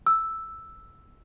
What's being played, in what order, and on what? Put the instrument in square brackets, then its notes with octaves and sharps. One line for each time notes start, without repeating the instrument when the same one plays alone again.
[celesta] E6